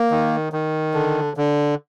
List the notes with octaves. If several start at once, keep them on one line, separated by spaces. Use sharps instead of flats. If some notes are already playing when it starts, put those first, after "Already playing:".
Already playing: A#3
D#3
D#3
D3
D3